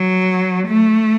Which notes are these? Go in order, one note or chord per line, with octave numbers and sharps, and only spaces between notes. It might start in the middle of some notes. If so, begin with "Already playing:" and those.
Already playing: F#3
A3